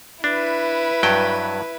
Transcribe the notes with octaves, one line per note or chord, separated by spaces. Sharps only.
D4 E4 B4
G2 F#3 G5